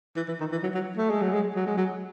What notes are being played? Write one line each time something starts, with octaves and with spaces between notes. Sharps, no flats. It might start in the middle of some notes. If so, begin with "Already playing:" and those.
E3
E3
D#3
E3
F#3
F#3
A3
G#3
F#3
G#3
F#3
G#3
F#3